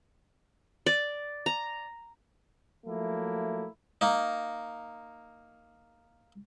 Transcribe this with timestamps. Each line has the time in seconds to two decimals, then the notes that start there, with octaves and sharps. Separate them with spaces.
0.86 D5
1.46 A#5
2.86 F3 F#3 A3 A#3 E4
4.01 A#3 D#4